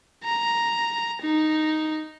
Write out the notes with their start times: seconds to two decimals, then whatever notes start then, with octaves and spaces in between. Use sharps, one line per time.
0.25 A#5
1.22 D#4